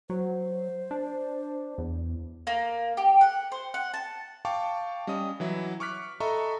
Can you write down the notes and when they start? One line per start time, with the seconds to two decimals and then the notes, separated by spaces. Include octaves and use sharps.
0.10 F#3 C5
0.91 D4
1.78 E2
2.47 A#3
2.97 G4
3.21 F#5
3.52 C5
3.74 F#5
3.94 A5
4.45 F5 G5 A5 C#6 D6
5.07 G3 C#4 D#5 D#6
5.40 E3 F#3 E4
5.80 C#6 D6 F6 F#6 B6
6.20 A4 D#5 E5 A#5 B5 C#6